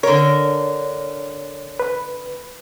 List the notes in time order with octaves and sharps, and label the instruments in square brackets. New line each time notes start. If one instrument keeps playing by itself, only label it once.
[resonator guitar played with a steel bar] D3 A#4 [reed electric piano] C#5
[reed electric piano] B4